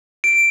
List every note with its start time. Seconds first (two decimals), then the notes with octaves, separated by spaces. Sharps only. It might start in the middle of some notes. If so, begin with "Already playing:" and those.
0.24 D7